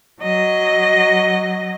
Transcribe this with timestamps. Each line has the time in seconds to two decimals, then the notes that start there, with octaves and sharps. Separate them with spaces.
0.22 F#3 D#5